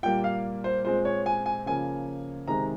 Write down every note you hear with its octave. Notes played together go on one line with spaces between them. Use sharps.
A#2 G3 A#3 G5
F5
C5
A#2 G#3 C4 C5
C#5
G#5
G#5
C#3 F3 A#3 G#5
C3 D#3 G#3 C4 A#5